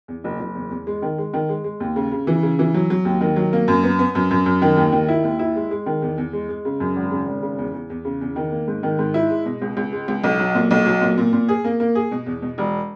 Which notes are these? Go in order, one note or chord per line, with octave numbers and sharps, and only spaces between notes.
E2
F#1
F#1
E2
E2
G#3
D#3
G#3
D#3
G#3
G#3
D#2
C#3
C#3
E3
C#3
E3
F#3
F#3
D#2
D#3
F#3
A#3
F#2
B3
B3
F#2
F#2
F#2
D#3
D#2
D#3
E4
D#2
E4
G#3
G#3
D#3
E2
E2
G#3
G#3
C#3
F#2
G#1
C#3
G#1
C#3
E2
E2
E2
C#3
E2
D#3
A#3
G#2
D#3
G#2
E4
G#3
B2
C#2
C#2
G#3
C#2
B1
F#3
A#2
B1
F#3
A#2
A#2
A#2
G#4
A#3
A#3
G#4
B2
E2
B2
E1